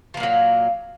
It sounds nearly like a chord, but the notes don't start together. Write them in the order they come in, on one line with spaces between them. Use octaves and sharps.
F3 A#3 A#2 F#3